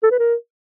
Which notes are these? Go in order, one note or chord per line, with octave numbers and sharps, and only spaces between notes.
A4
B4
A#4